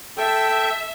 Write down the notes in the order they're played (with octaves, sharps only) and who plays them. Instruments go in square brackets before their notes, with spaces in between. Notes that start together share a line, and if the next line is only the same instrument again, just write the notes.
[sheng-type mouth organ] A4 G5 [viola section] E5